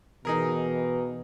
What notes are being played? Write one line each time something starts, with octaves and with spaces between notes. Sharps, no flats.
B2 E3 D#4 G#4 A#4